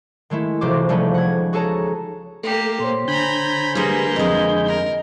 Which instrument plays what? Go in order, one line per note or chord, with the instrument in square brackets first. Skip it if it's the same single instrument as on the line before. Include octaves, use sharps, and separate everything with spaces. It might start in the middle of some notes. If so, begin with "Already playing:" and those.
[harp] D#3 G#3 A3 E4
F1 C#2 E3 F#4 C5 D6
F3 G3 A3 C#4 D#4 B4
F#5 G#6
F#4 G#4 A4 C#5 A5 A#5
[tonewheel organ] A3 [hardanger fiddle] A#3 G4
[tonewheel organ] A#2 [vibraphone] C5 C#5 C6
[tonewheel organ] D3 G#5 G6 [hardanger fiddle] A#5 B5
[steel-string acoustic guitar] G3 G#3 [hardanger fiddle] A#3 B4
[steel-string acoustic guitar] F2 G#3 [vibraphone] D#5
[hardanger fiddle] A#4